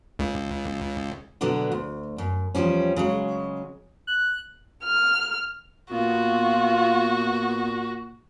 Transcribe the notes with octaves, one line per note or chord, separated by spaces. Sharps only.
C#2
B2 D3 F#3 B3 D4
D2
F#2
E2 G2 F3 G3 C#4
C#3 F#3 G#3
F#6
F6
A#2 B3 F4 F#4